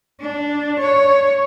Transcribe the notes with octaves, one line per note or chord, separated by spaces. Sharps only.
D4
C#5